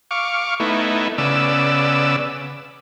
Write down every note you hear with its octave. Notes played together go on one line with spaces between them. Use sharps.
F5 C#6 D6
A3 B3 D#4 E4
C#3 B3 D5 E6